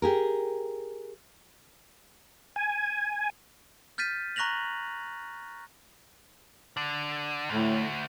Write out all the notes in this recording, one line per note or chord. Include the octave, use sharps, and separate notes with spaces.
G4 G#4 A#4
G#5
F6 G6 A6 B6 D#7
A#5 C#6 F#6 A#6 F7 F#7
D3
D2 A2